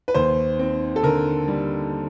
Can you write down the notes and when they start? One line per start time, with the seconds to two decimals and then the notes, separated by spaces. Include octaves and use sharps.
0.08 B4
0.14 D#2 C5
0.59 C4
0.96 A4
1.03 D3 A#4
1.48 G3